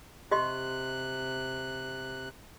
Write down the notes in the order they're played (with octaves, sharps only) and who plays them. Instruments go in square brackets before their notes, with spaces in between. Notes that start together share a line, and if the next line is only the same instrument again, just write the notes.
[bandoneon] C3 F#6 [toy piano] G4 D#5 C6